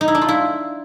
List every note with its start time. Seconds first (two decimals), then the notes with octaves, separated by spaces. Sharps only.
0.01 D#4
0.08 E4
0.15 D4
0.22 F4
0.28 E4